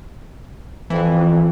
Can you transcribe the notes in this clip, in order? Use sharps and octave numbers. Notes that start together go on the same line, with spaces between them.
F2 E3